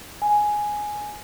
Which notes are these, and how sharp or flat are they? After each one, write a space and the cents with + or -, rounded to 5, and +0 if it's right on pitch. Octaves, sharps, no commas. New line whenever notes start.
G#5 +5